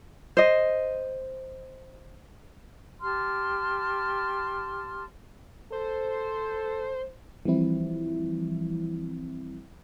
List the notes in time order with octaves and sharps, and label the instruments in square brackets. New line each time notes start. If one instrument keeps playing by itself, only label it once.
[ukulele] C5 D#5
[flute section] G4 A5 C6 F6
[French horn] A4 [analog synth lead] C5
[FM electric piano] E3 F3 G3 C4 E4